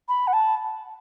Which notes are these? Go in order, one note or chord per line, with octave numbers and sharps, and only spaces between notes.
B5
F#5
A5